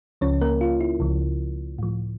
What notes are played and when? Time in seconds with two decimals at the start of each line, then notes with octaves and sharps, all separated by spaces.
0.21 C#2 C#3 F3 C#4 C#5
0.41 A#3 A#4
0.61 F4
0.81 E4
1.00 C#2 C#3 F3
1.78 A2 F3